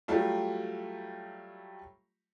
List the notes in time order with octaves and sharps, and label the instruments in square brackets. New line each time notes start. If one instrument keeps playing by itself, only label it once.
[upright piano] F#3 G3 A3 F4